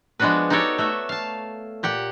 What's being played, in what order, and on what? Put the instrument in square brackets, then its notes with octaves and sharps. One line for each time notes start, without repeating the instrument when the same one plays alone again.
[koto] F3 G#3 B3 D4 F#4 B4
D#4 F#4 G4 A4 C#5 D5
A3 F#4 E5
F5 A5
A#2 G4 F#5 G5